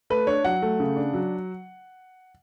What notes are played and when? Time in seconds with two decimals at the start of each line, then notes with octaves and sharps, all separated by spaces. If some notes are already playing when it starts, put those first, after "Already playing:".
0.10 A3 B4
0.27 D4 C#5
0.44 F#3 F#5
0.62 A3
0.80 C#3
0.97 D4
1.14 F#3